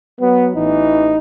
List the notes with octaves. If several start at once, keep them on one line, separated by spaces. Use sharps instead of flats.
F#3 B3
A1 E3 D#4